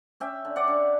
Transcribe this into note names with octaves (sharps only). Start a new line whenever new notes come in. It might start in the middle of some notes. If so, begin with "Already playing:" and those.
C#4 E5 G5
D3
D5 F#5
D3